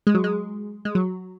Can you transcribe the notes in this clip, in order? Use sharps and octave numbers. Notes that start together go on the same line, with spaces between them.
G#3
F#3
G#3
G#3
F#3